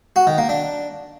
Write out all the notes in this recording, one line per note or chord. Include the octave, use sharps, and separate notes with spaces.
F#4
D#3
A#3
D4